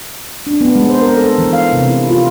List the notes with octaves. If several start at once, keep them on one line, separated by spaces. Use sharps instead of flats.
D4
B3
G#3
C5
A#4
A4
E3
F5
C3
E4
F4